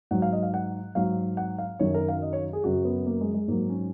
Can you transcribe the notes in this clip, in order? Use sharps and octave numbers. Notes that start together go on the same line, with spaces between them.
G#2 F#3 F#5
F5
D#5
F5
F#5
G#2 F#3 F5
F#5
F5
F#2 D#3 F#3 C#5
A#4
F5
D#5
C#5
G#4
F#2 C#3 F#3 F#4
B3
A#3
G#3
G#3
G#2 F#3 A#3
C#4